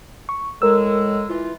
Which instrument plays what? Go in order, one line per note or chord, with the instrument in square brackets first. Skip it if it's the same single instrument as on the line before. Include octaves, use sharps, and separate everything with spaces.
[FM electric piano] C#6
[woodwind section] A2 G#3 [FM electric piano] A#4 E6
[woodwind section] E3 F4